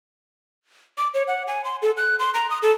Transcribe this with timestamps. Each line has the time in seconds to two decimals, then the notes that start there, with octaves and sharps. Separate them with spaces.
0.98 D6
1.14 C#5
1.27 F#5
1.47 G#5
1.64 C6
1.82 A4
1.97 F#6
2.19 C6
2.34 A#5
2.50 D#6
2.62 A4